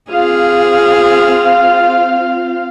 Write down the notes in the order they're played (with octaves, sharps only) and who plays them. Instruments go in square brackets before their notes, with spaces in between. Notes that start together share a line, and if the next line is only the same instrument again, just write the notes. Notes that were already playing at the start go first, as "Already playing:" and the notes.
[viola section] C4 F4 F5 [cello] G#4